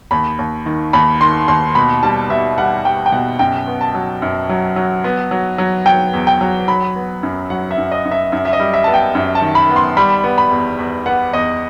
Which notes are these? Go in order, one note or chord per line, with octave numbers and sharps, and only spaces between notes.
D#2 B5
D#2
D#3
D#2 B5
D#3 C6
D#2 C6
B2 B5
G3 A5
B2 E5
G3 F#5
G3 G5
G5
B2 F#5
F#2 G5
B3
A5
F#3
F#2
F#3
F#3
B3
F#3
F#3
F#3 G5
E2
G5
F#3
F#3 B5
B3
F#2
F#3 F#5
E5
F#2
D#5
F#2
E5
F#2 E5
E5
D#5
G3
E5
B3 A5
G5
F#2
A5
D#3
B5
B3
C6
G3 B5
B3
B5
E2
E2
B3 F#5
E2 D#5